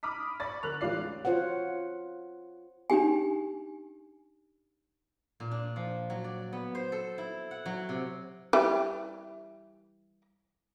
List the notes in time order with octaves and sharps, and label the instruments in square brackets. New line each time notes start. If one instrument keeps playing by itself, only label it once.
[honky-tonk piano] B5 D6 D#6 F6 B6
D5 B5 C#6 A6
D3 A#4 F#6 F7
A1 G#3 C#4 F4 D5 C7
[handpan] F4 C5 C#5 F#5
[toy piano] D4 D#4 G4 G#5
[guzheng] A#2
D4
F3
F#3
D5
B3
C5
A4
E4
F#5
F#3
C3
[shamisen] E3 G3